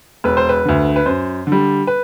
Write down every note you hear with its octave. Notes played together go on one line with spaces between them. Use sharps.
E1 B4
C5
B4
D2 D3
B4
F#2 C5
D3
G3
B4